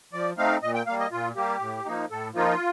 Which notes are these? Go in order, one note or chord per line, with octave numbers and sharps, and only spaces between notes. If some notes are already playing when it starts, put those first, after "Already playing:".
F3 D5
A3 C4 D#4 F5
A#2 D#5
G5
G3 A#3 F5
D#5
A#2 F4
G3 A#3 G4
A2
F3 A#3 D#4
A2 A4
F3 A#3 D#4 F4